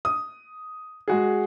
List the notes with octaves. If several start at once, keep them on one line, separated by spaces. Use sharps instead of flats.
D#6
G#3 F#4 G#4